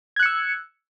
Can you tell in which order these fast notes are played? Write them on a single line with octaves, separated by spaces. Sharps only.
G#6 F#6 C#7 E6